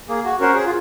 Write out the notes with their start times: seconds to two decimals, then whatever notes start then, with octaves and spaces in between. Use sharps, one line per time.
0.09 A#3 G#4
0.24 F#4
0.40 C#4 F#4 A#4 C5 F#5
0.54 G#4
0.65 F4